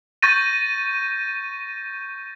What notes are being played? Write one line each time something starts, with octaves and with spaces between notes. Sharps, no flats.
C#6 G6 A6 A#6 D#7